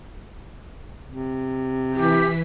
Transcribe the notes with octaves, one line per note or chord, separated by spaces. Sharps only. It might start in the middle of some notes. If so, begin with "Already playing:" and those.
C3
E3 G4 B6